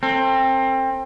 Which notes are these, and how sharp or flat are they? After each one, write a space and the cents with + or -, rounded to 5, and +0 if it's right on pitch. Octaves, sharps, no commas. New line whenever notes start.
C4 +20 A4 +30